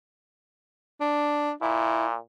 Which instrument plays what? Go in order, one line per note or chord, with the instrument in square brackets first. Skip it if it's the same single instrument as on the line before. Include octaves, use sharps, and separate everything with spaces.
[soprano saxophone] D4
[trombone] A#2 [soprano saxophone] E4